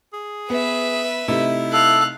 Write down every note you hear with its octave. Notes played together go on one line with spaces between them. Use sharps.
G#4
B3 B4 E5
C3 A3 D#4 E4
A4 F5 F#6